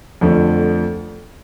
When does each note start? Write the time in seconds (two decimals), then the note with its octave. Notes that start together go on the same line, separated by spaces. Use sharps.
0.21 F2 D3 F3 A3